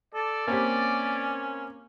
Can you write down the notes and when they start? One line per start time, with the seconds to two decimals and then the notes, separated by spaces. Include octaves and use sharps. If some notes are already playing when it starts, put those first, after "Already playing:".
0.15 A4 D5
0.48 A#3 C4 C#4 G4